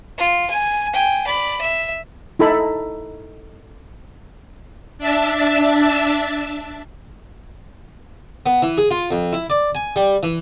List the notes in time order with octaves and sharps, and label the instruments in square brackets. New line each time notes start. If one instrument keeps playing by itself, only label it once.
[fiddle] F4
G#5
G5 G#5
D5 B5
E5
[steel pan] D#4 E4 A4 B5
[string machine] D4 E5 A5
[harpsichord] B3
E3
G#4
F4
F2
E4
D5
G#5
G3
E3